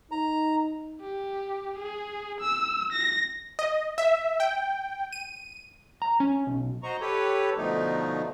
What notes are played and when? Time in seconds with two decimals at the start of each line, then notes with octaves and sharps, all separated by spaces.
0.11 D#4 A#5
1.01 G4
1.79 G#4
2.41 E6
2.92 A#6
3.59 D#5
3.98 E5
4.40 G5
5.12 D#7
6.02 A#5
6.20 C#4
6.47 B1
6.83 F#4 C5 D#5 A#5 C#6
7.01 G4 A4 B4 C#5
7.57 B2 D3 F3 A3 D#4